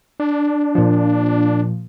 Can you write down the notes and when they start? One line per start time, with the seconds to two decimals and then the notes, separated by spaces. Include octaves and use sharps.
0.20 D4
0.75 A#2 F3